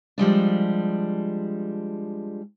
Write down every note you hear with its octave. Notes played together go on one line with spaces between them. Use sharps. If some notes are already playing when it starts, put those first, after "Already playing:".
F3 G3 G#3 D4